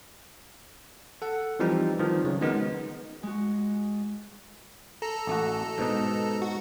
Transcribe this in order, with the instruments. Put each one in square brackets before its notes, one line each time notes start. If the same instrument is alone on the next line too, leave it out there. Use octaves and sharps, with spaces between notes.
[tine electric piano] A4 F#5
E3 F3 G3 C4 D#4
D#3 F3
C#3 F#3
D#3 G#3 B3 D#4 A#4
[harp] G#3 F#4
[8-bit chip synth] A4 A#5
[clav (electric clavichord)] A1 A3 F#4
G#2 B2 D#4
[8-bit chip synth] F#4